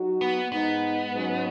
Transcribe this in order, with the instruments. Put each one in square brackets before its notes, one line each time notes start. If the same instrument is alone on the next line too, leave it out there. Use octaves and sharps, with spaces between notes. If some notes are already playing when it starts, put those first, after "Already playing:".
Already playing: [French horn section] F#3 D#4 F#4
[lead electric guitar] B3
[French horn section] G#2 G#3 D#4 [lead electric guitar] B3
[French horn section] G#2 F#3 C#4